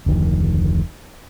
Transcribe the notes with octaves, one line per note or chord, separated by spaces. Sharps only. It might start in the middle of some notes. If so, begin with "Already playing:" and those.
F1 D2 D#3 F3